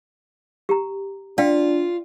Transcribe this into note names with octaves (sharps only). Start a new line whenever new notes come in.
G4 A#5
D4 F4 D5 F5 G5